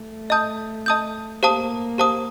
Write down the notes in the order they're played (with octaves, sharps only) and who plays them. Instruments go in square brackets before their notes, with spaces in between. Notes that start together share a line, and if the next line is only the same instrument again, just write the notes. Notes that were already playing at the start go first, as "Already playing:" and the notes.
Already playing: [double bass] A3
[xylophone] D#5 A5 D#6 G6
D#5 A5 D#6 G6
[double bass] A#3 [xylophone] G4 C5 F5 A5 D#6
[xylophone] G4 C5 F5 A5 D#6